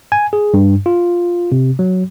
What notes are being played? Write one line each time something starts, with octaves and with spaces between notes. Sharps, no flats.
G#5
G#4
G2
F4
C3
F#3